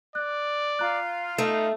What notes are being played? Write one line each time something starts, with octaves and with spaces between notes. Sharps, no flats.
D5 F#6
F4 A#5 F#6
A3 D#4